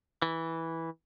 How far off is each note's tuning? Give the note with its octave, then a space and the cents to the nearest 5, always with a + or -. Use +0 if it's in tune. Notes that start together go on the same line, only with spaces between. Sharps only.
E3 -10